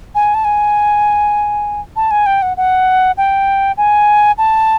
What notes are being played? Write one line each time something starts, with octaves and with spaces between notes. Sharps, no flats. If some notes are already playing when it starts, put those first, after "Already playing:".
G#5
A5
G#5
A5
G#5
G5
F#5
F#5
G5
G#5
A5